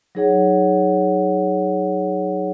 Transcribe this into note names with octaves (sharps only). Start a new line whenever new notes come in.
F#3 D#4 G#4 C#5 F#5